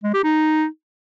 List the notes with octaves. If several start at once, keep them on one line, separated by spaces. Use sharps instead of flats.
G#3
G4
D#4